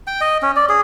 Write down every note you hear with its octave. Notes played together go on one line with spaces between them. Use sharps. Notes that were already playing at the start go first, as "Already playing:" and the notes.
G5
D#5
C#4
D5
G#4